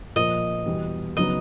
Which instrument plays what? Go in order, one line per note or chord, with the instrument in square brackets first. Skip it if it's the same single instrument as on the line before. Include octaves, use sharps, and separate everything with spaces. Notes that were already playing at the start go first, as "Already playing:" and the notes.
[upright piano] A#2 F3 A#3 [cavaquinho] D#5
[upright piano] E2 B2 G3
[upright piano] C#3 F#3 B3 D#4 [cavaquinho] D#5